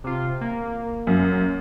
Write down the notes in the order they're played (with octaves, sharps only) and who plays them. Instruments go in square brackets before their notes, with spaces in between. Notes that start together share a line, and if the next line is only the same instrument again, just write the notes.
[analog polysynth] C3 F4
A#3
[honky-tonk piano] F#2